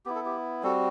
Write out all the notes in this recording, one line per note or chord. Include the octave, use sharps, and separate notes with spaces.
B3 E4 G4
A4
G4
G3 C4 F#4 A4